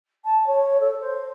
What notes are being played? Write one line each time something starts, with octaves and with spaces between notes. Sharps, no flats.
A5
C#5
A4
C5